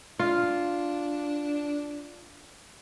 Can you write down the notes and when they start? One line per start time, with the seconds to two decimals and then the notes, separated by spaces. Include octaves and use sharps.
0.19 D4 F4